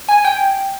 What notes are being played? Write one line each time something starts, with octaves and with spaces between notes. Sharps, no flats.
G#5
G5